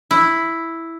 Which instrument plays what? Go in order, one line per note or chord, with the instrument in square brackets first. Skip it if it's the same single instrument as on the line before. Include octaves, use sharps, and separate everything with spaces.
[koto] E4